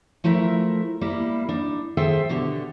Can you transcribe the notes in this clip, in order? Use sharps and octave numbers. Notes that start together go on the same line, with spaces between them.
F3 A3 E4 A#4 E5
G3 A#3 E4
D4 D#4
D#3 G#4 A4 C5 E5 G5
B2 D3 D4 G4